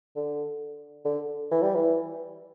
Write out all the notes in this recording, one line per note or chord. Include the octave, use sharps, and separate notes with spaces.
D3
D3
E3
G3
E3